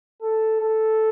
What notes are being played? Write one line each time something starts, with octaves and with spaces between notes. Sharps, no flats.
A4
A4